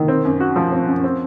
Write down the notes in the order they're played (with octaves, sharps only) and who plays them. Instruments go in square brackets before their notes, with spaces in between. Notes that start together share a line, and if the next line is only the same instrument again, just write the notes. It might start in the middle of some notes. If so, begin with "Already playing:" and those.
Already playing: [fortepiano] D#3
[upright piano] C4
F#2
F#4
F3
C4
F#2
C4